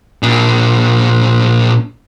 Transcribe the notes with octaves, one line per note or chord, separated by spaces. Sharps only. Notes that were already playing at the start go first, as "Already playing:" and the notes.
A#2 D4